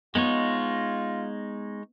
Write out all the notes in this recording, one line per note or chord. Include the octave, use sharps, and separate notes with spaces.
G#3 B3 D#4 F4 C#5